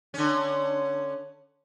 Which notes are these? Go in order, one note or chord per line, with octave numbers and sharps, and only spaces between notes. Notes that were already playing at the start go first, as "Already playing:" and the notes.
D3 C#4